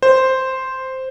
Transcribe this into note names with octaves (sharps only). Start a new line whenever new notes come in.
C5